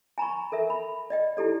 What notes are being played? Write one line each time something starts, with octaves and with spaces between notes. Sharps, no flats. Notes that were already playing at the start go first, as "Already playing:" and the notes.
G#5 A#5 B5 C#6
A4 A#4 E5
B5
D5 D#5 G5
D#4 E4 G4 A4 D5